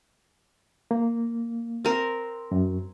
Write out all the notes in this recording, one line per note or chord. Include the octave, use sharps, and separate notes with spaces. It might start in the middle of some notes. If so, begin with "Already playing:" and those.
A#3
C4 A#4
F#2